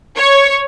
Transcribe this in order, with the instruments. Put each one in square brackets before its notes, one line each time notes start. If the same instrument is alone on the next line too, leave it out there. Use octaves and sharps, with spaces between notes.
[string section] C#5